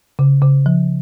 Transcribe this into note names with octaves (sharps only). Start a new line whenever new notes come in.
C#3
C#3
F3